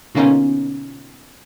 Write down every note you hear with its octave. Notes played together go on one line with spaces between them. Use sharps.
B2 D3 A#3 C#4 D#4 F4